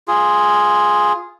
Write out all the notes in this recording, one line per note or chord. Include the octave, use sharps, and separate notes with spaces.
F4 G#4